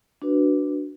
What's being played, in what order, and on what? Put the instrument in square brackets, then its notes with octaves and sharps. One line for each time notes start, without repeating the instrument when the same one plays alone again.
[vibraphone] D4 F#4 B4